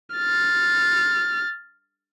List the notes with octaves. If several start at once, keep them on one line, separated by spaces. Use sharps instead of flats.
F6 A6